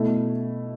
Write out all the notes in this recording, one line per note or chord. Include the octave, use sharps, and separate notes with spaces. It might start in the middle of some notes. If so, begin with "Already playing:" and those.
Already playing: B2 A3 E4